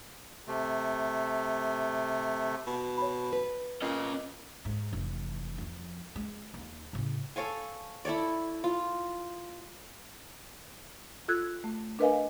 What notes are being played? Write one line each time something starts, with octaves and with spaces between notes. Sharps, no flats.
C3 A3
B2
C#5 B5
B4
A#2 C#4 D#5
G#2
F1 E3
F2 F3
G#3
D#2
A2 C#3
A4 C#5 F5 G#5
E4 A4 C#5 D5
F4
F4 A4 E6 F#6 G#6
A3
D4 A#4 B4 D#5 F5 G#5